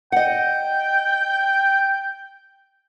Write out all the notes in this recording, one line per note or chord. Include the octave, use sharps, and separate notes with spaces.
D#5 F#5 G5